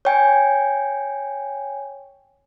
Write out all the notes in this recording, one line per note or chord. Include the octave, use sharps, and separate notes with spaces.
C#5 G5 G#5